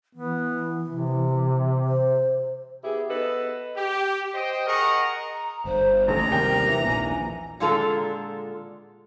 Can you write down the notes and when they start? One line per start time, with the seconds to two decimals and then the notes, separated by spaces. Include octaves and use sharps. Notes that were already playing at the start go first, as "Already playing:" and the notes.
0.16 E3 B3
0.88 C3
1.85 C5
2.84 B3 E4 G4 G#4
3.09 B3 A4 B4 D#5
3.76 G4
4.35 C5 D#5 G5
4.66 G#4 A#4 D#5 F#5 A#5 C#6
5.34 A#5
5.65 G1 C5
6.08 A1 D#2 A#5
6.30 D#2 C3 G3 A#4 G5
6.66 E3
6.85 A#1 D#2 A#2 G#5
7.60 A#2 D3 G#3 F4 A4 A#5